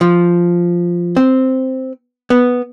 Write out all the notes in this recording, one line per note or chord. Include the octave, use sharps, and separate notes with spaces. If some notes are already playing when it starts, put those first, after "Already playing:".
F3
C4
B3